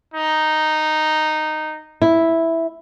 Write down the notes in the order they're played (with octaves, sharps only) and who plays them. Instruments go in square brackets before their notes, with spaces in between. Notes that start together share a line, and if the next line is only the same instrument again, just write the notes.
[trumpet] D#4
[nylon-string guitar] E4